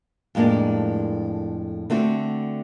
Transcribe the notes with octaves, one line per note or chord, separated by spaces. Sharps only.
F2 A2 G#3 A#3 D4
D3 A3 C4 F#4